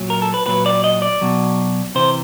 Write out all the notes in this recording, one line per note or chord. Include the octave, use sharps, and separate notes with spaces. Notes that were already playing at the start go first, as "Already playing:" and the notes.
Already playing: A#2 F#3
A#4
A4
B4
A#2 F#3 B4
D5
D#5
D5
B2 F#3
C3 E3 C5